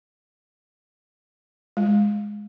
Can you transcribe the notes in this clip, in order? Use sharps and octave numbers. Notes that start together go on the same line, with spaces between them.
G#3